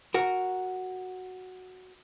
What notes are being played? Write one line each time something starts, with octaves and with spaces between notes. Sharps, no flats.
F#4 A#4